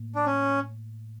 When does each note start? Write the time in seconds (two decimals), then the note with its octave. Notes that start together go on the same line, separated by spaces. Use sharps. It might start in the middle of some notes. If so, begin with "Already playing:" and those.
Already playing: A2 A#3
0.15 D4
0.26 C#4